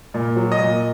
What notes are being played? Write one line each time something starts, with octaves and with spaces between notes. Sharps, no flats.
A#2
F#3
D#5
A#2